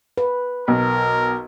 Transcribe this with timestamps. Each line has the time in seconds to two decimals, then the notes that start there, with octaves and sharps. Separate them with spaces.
0.18 B4
0.68 B1 A#4